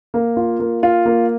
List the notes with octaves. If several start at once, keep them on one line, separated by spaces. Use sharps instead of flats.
A#3
F4
A#3
F4
A#3